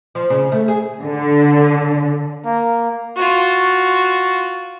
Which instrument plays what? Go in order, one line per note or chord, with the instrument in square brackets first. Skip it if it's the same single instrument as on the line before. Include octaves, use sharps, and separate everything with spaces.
[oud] F3
C#3
A3
G#4
[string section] D3
[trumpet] A#3
[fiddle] F4 F#4